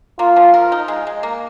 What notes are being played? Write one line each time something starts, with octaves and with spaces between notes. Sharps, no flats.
A#3 F4
F3
A#4
D#4
G#3
G#3
A#3